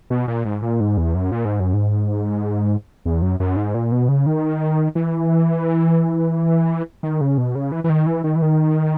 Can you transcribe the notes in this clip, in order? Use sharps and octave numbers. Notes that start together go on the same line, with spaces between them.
B2
A#2
G#2
A#2
G#2
E2
F#2
A#2
G#2
F#2
G#2
E2
F#2
F#2
G#2
A#2
B2
C#3
D#3
E3
D#3
C#3
B2
C#3
E3
E3
D#3
E3
D#3
E3
D#3